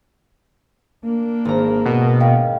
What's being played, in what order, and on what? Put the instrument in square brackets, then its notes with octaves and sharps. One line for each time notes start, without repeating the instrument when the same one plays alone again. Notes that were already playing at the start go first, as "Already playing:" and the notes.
[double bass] A#3 D4
[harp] G#1 A#5
[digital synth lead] B2
[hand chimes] D#5 F5 G5